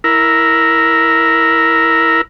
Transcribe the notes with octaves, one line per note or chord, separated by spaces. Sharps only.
E4 A#4